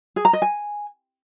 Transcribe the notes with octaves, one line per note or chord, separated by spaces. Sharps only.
G#4
A#5
D#5
G#5